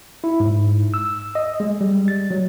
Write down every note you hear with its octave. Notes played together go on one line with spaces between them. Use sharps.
E4
G#2
E6
D#5
G#3
G3
A6
F#3